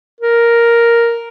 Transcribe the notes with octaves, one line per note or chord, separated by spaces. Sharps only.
A#4